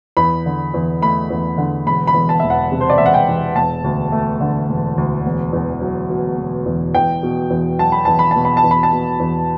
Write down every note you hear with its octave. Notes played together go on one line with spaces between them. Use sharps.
E2 B5
D3
E2
A3 B5
E2
D3
E1 B5
B5
E2
A5
E1 E5
F#5
C3
C5
D5
E1 E5
F#5
G5
E2
E1 A5
D2
A3
D3
E1
D2
E1
E2
F#3
B2
E1
E2
E2 G5
B2
E2
F#3 A5
B5
E2 A5
B5
B2 A5
B5
A5
E2
B5
A5
B2
E2